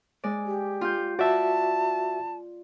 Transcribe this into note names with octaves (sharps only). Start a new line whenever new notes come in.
G#3 D5
G4
F4 G6
F#4 D5 E5 A5